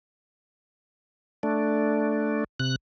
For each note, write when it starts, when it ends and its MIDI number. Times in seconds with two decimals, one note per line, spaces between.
1.43 2.44 57
1.43 2.44 62
2.60 2.76 48
2.60 2.76 90